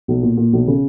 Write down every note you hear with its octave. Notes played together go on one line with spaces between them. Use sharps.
B1
A#2
A#2
B1
C#3